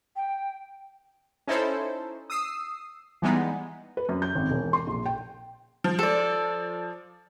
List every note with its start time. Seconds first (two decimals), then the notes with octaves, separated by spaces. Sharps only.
0.16 G5
1.47 C#4 D#4 E4 A4 C5
2.30 D#6 E6 C7
3.22 E3 G3 G#3 B3 D#4
3.97 B4
4.09 F#2
4.22 G6
4.35 G#1
4.50 E1
4.73 C6
4.87 A#1
5.06 G5
5.84 F3
5.99 A4 D5